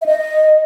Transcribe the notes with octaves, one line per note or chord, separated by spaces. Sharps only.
E5
D#5